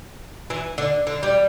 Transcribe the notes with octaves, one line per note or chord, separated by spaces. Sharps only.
E3
D3
D3
G3